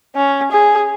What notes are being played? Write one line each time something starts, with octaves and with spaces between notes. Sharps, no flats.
C#4
G#4